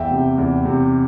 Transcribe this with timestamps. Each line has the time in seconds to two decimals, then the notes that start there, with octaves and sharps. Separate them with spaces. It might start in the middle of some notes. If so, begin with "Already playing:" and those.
Already playing: E2 E5 G5
0.11 C3
0.38 E2
0.65 C3